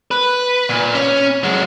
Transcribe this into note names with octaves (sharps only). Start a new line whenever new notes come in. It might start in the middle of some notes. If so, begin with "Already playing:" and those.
B4
A#2
C#4
F#3 G#3